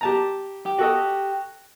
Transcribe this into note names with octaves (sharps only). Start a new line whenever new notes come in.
G4 A5 A#5
G4
F#4 A4 D#5